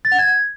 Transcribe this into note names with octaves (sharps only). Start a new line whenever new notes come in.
A6
F#5
G#6